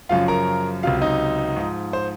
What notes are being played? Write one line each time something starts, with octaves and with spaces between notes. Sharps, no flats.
F#2 C#3 F3 F4 F5
A#4 A#5
C#2 C3 F#3 F4 F5
D#4 D#5
G#2 F3
C5